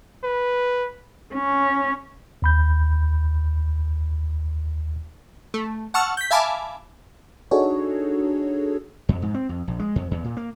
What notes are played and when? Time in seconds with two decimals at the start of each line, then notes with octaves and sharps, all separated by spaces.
0.24 B4
1.35 C#4
2.42 D#2 B5 G6
5.54 A3
5.94 F#5 A5 C#6 E6 F6
6.17 G6 B6
6.31 E5 F5 G#5 A5 B5 D6
7.51 D4 D#4 F#4 G#4 A4 C#5
9.09 F2
9.22 G#2
9.34 C4
9.49 F2
9.68 A#1
9.79 G#3
9.96 F2
10.11 E2
10.24 A#2
10.37 A#3